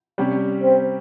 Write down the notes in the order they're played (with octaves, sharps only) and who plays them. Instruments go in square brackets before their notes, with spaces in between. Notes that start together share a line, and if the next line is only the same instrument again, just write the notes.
[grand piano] C3 G3 C#4 G4
[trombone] C4